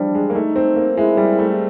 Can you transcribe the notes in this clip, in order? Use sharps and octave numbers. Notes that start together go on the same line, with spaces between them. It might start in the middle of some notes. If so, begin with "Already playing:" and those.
Already playing: E3 F3 G3 D4
G#3
A#3
A3 D#4
C4
A#3
G#3 E4
G3
A3